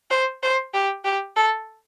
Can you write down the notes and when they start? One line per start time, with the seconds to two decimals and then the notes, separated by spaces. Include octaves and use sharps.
0.11 C5
0.43 C5
0.74 G4
1.05 G4
1.36 A4